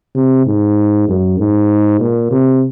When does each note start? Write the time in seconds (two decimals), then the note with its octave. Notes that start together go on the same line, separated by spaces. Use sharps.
0.15 C3
0.46 G#2
1.09 F#2
1.39 G#2
2.00 A#2
2.31 C3